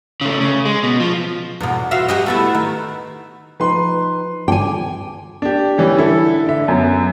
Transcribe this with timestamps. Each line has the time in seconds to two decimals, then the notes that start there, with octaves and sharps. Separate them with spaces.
0.21 C#3 A3
0.40 C#3
0.65 G#3
0.83 B2
1.00 F3
1.60 E2 B2
1.91 F4 F#4 E5
2.08 F#4 G4 D#5
2.26 A3 B3 E4
2.55 D#3
3.60 F3 D#4 B4 C6
4.48 D3 E3 G5 G#5 D6
5.42 D4 G4
5.78 E3 G3 C#4
5.97 D3 E4 A4
6.47 D3 E5
6.67 F#2 B3